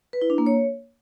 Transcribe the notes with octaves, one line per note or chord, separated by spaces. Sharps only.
B4
E4
D4
A#3
C#5